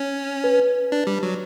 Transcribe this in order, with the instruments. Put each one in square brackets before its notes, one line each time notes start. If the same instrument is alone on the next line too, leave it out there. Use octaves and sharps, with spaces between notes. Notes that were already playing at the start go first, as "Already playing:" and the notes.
Already playing: [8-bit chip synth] C#4
[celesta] B4
[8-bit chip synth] D4
G3
F#3